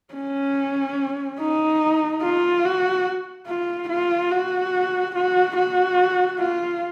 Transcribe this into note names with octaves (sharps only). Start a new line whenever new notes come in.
C#4
D#4
F4
F#4
F4
F4
F#4
F#4
F#4
F4